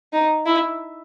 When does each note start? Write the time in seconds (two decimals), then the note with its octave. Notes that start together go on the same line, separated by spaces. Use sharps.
0.13 D#4
0.46 E4